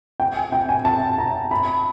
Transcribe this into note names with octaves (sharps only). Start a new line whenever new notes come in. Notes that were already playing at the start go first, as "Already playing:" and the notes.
G5
G#5
G5
G#5
A5
A#5
B5